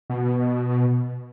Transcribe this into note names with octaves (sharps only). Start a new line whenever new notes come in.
B2